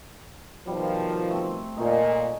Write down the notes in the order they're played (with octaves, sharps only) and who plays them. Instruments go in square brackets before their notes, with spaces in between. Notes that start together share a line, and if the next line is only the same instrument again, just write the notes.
[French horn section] B2 D#3 F3 [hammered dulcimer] G3
[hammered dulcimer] A3 C4
[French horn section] A#2 [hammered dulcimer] D#4 C#5 G#5